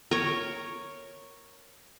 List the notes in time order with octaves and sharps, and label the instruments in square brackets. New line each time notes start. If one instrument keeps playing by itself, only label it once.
[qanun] A#4 C#5